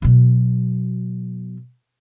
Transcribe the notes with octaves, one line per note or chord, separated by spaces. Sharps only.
B2 F#3